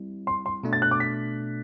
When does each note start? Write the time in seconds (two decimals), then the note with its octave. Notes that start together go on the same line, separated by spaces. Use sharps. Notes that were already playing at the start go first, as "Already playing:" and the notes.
Already playing: G3 C4 E4
0.27 C6
0.46 C6
0.63 B2 A3 D4
0.73 A6
0.82 F#6
0.91 D6
1.00 B6